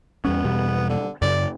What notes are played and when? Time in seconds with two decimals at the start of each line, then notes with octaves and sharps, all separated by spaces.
0.25 E2 G3 B3 C#4
0.44 E2 B2 G3
0.89 D3
1.22 F#2 C#3 D5